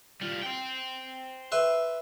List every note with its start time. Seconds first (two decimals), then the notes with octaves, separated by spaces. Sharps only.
0.21 G3 F4
0.42 C5 G5
1.52 B4 E5 C6